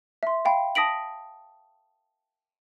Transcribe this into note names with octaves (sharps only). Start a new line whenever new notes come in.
E5 C6
F5 G5 B5
A5 D#6 A#6 B6 D7 F#7